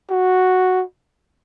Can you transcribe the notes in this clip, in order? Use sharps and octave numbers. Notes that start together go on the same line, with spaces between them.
F#4